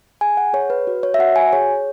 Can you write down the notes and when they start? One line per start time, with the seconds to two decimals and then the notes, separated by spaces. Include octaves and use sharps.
0.21 G#4 G#5
0.37 F#5
0.53 G#4 C#5
0.70 B4
0.87 F#4
1.03 C#5
1.14 E5
1.19 F#4 F#5
1.36 G#5
1.53 G#4 C#5